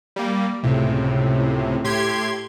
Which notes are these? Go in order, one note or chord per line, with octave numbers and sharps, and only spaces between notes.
G3 A#3
C#2 A2 C3
A2 G4 C6 G#6